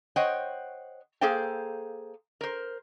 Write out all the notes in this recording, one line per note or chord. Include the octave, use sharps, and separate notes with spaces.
C5 C#5 D#5 F#5 G5
A#3 G#4 A4 C5 F5 G5
A#4 C5